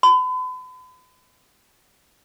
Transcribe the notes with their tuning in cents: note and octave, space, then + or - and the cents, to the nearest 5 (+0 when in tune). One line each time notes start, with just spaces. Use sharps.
B5 +40